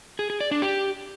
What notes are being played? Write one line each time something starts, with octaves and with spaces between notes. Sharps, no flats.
G#4
G#4
D5
D4
G4